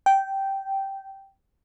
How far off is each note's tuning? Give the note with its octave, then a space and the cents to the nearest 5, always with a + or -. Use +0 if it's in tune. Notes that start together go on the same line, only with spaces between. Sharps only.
G5 -10